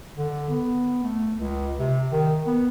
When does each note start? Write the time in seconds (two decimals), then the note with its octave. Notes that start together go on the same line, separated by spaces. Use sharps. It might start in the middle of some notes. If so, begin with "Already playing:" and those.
0.16 D3
0.50 B3
1.04 A3
1.36 C#2
1.79 C3
2.12 D#3
2.46 B3